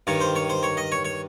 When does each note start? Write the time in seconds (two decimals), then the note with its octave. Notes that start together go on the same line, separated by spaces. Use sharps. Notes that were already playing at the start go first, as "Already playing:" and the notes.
0.07 G2 D#3 C#5
0.20 C5
0.36 C#5
0.50 C5
0.63 C#5
0.77 D#5
0.92 C#5
1.05 C#5